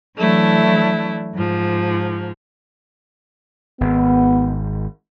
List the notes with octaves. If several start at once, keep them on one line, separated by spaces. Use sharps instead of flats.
E3 F#3 A3 D4 E4
G#2 F3
G#1 B3